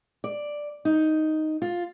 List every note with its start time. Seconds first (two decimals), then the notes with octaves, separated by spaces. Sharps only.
0.24 D5
0.85 D#4
1.62 F4